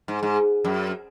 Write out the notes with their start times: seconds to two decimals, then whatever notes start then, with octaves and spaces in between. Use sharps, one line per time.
0.08 G#2
0.23 G#2
0.65 F#2